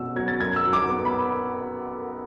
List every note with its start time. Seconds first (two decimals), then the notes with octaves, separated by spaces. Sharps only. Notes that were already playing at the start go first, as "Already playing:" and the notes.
Already playing: B2 C#4 F#5 E6
0.16 F#3 G#6
0.28 A6
0.40 F#2 G#6
0.56 E6
0.65 F#3
0.73 D6
0.89 B3
1.05 B5